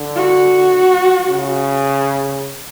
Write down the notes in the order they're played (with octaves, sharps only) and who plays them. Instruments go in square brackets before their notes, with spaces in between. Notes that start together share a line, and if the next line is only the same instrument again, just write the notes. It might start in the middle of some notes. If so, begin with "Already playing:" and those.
Already playing: [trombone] D3
[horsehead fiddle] F#4
[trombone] C#3